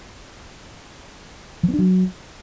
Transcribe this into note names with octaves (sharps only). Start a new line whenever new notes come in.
F3
B3
D4
F#3